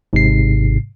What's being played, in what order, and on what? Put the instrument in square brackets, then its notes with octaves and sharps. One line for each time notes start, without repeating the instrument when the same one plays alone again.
[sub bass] G#1 [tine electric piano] G#2 C3 C7